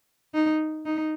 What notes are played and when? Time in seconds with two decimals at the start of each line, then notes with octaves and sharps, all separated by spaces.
0.34 D#4
0.85 D#4